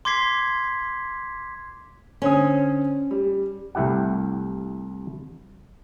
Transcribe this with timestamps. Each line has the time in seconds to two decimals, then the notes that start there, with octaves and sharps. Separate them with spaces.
0.05 C6 D6 G#6 B6 C7
2.22 D3 C#4 C5 D#6
3.11 G3
3.75 C2 A3 E4 G4 F#5